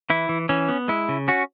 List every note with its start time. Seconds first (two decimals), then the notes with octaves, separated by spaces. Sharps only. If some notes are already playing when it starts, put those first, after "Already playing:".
0.10 E3 E4
0.29 E3
0.49 E3 C#4
0.69 B3
0.88 G#3 E4
1.09 C#3
1.28 C#4 F#4